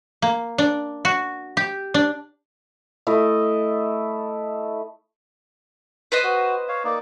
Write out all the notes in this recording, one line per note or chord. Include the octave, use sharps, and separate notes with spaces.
A#3
D4
F#4
G4
D4
A3 E4 D#5
B4 C5 D#5
F#4
C#5 F5
A#3 D#4 D5